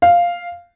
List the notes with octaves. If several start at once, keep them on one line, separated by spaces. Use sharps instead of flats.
F5